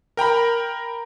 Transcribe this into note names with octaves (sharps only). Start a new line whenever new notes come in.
A#4 G5 A#5 B5